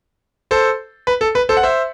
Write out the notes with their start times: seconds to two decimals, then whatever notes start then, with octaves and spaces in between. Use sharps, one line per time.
0.51 A4 C5
1.07 B4
1.21 A4
1.35 B4
1.49 A4 C5
1.57 F#5
1.63 C5 E5